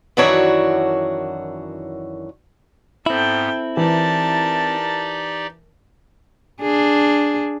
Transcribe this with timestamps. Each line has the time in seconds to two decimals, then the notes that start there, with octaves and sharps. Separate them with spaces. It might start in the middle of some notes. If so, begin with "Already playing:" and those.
0.17 F#2 D#3 E3 D4 F#4 C#5
3.06 G#2 B3 C4 E4 A4 G5
3.77 E3 D#4 G4 A#4 D5 A5
6.60 D4 G#4